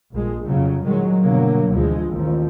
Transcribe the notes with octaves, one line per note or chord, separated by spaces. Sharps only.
A#1 G#3
F2 C#3 F#3
A#2 D#3 F#3 G#3
G1 B2 D3 F#3 A#3
D2 E3 F3 G#3
A1 D#2 F3